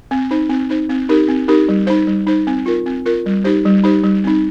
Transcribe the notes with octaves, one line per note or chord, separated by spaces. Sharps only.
C4
D#4 C5
C4
D#4 C5
C4
D#4 G4 A#4
C4
D#4 G4 A#4
G3
D#4 C5
G3
D#4 C5
C4
F4 A#4
C4
F4 A#4
G3
D#4 G4 C5
G3
D#4 G4 C5
G3
C4 D#4